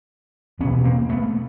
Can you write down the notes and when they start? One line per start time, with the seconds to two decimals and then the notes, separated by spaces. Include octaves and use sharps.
0.59 E2 B3 C#4
0.65 B2
0.84 A#3 C4
1.09 A3 B3